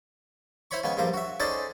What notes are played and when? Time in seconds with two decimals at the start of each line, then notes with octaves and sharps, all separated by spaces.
0.71 E4 C5 C#5 B5 C#6
0.84 C#3 G#3 B3 G#5
0.97 A#1 G2 F3 C5 A#5
1.14 F#4 E5
1.40 C#4 D#4 G#4 A4 C5 D5